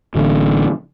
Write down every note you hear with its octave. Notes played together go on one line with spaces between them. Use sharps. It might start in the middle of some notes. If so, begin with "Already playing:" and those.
A1 D3